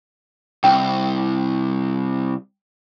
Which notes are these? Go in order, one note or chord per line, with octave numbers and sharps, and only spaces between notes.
C2 G5